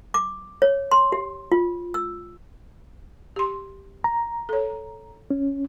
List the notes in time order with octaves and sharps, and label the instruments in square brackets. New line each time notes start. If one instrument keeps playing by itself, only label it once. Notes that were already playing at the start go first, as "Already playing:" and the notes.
[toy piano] D6
C#5
C6
G4
F4
E6
[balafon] G4 C6
[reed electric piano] A#5
[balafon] A4 C#5
[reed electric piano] C#4